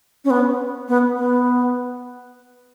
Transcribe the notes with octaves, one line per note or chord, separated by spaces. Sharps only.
C#4
B3
B3
B3